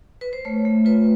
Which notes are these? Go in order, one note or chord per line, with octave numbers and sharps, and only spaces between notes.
B4
C5
A3 C#5
A3
F4 B4